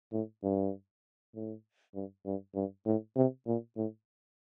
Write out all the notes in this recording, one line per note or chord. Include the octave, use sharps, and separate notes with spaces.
A2
G2
A2
G2
G2
G2
A2
C3
A#2
A2